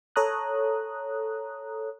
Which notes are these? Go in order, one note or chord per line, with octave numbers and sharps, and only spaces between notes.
A4 C#5 A#5 D#6 F#6